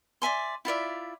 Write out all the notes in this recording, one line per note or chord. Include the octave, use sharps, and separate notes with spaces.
D5 E5 G#5 C6
E4 F4 D5 E5